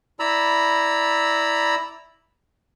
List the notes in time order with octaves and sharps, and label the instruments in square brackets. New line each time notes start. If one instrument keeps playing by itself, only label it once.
[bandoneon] E4 D5 A#5 B5 E6